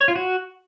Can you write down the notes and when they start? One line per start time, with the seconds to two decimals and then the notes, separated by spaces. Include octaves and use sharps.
0.01 C#5
0.08 F4
0.16 F#4